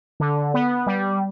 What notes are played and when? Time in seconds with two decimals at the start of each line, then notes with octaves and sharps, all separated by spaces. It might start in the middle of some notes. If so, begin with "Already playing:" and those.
0.20 D3
0.54 B3
0.87 G3